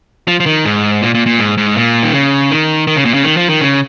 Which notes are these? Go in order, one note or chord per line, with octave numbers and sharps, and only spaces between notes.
F3
F3
D#3
G#2
A#2
A#2
A#2
G#2
G#2
A#2
D#3
C#3
D#3
D#3
C#3
A#2
C#3
D#3
F3
D#3
C#3